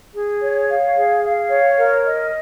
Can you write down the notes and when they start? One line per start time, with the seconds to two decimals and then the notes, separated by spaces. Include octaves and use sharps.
0.14 G#4
0.42 C#5
0.68 F5
0.96 G#4
1.23 F5
1.50 C#5
1.78 A#4
2.05 D#5